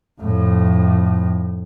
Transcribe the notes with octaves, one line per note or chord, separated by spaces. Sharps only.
F2 A2